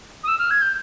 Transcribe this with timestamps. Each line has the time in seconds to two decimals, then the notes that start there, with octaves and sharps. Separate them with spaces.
0.24 D#6
0.28 E6
0.39 F6
0.51 G#6
0.62 G6